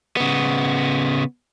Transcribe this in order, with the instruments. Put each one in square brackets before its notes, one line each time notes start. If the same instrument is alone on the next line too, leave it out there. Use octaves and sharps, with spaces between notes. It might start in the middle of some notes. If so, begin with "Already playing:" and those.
[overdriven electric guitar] C#3 B3